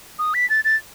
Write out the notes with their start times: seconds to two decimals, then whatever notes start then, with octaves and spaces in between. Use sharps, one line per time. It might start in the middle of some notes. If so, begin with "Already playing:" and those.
0.19 D#6
0.34 B6
0.50 A6
0.65 A6